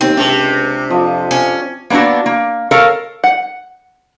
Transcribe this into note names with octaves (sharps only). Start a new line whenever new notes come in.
D#2 C4
C#2 C3 D4 D5
F2 F3
C#4
A#3 B3 D4 E4 F#4
A#3
A4 A#4 C#5 F5
F#5